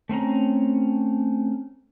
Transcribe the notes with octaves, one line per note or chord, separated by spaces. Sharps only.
A3 C4 C#4 A#5